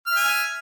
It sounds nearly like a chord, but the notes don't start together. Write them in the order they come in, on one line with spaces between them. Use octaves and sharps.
F6 E5 G#5